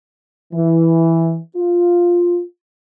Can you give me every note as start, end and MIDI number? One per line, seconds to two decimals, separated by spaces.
0.54 1.38 52
1.56 2.42 65